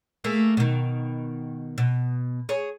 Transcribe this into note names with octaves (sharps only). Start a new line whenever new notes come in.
A3 A#3 G#4
B2 D#3
B2
G#4 C#5